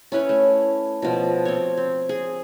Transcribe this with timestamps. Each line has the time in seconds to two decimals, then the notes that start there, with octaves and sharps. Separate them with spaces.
0.12 C#4 E4 B4 C#5
0.29 A3
1.02 B2 F3
1.45 C4 C#5
1.77 C4
2.09 G#4